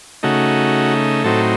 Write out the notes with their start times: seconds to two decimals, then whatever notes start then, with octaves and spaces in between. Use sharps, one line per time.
0.23 C#3 A3 D#4 F#4
1.24 A2 F#3 C4 D#4 A4